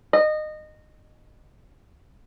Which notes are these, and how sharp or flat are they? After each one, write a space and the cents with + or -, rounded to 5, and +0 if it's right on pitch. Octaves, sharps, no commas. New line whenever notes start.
D#5 -20